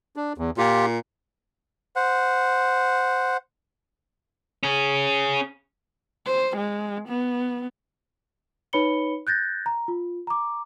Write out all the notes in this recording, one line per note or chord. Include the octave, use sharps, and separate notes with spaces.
D4
E2
A#2 F4 G4
C5 F#5
C#4 G#4
C5
G#3
B3
D#4 B4 C#5 B5 C#7 G7
F#6 G6 A6 A#6
A#5
F4
A#5 D6